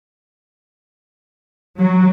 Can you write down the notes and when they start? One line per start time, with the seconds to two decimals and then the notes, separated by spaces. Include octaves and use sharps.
1.78 F#3